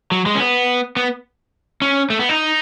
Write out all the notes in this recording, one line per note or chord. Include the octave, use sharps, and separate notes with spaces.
F#3
G#3
C#4
B3
B3
C#4
A3
B3
D#4